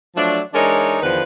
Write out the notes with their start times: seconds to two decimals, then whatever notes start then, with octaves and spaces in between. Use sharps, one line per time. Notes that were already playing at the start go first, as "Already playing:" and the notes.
0.16 F3 F#3 A3 D4
0.54 E3 G#3 D4 D#4 A#4 C#5
1.02 E2 D3 D#3 F3 B4